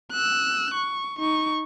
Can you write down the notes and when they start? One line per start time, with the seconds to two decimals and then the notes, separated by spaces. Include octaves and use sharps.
0.12 E6 F#6
0.74 C#6
1.19 D#4 C#6